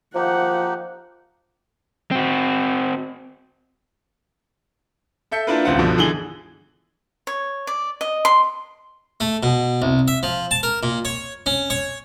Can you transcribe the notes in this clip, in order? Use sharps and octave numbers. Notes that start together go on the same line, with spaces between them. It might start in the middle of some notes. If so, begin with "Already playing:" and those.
F3 A#3 D#4 G4 F#5
C4 F#4
A4 E5 G6 C#7
A#3 D4 E4 F4 A#4 B4
D#1 C#2 C4 F4 F#5
G2 B2 D3 F3
D3 E3 G#4 F#7 G7
C#5
D5
D#5
C6
A3
B2
C2
E5
F3
A5
A#4
A#2
C#5
C#4
C#5